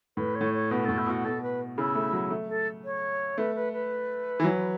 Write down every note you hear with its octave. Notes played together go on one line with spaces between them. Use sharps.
A2 B4
C#5
A2
C#5
B2 B4
A2 A4
E4
B2 F#4
B2 A4
B4
C#3 E4
A3
F#3
A3
A4
C#5
A3 B4
B4
B4
E3
F#3